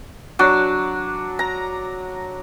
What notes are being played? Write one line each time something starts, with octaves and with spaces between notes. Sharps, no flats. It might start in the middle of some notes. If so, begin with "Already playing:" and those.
F#3 D4
A#5